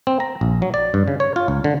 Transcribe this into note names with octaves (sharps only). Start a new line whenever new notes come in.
C4
A#5
A#1
F#3
D5
G2
C#3
C#5
F4
C#2
D3